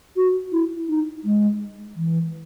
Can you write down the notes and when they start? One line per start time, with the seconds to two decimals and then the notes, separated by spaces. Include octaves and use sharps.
0.16 F#4
0.52 E4
0.89 D#4
1.24 G#3
1.96 E3